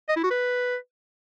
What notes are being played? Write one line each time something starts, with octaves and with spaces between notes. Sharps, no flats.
D#5
E4
F#4
B4